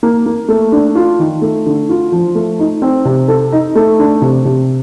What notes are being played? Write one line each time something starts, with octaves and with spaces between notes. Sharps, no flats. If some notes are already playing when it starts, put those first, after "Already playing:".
A#3
A#3
A3
D4
F4
D#3
A3
D3
F4
F3
A3
D#4
C4
C3
A4
D#4
A3
D4
C3
C3